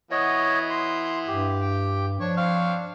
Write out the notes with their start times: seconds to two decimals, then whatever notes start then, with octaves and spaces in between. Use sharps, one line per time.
0.11 E3 B3 F#4 C#5 D#5
0.70 C6
1.28 G2 G4
1.61 G5
2.21 F3 D4 C#5
2.37 C4 F5 C#6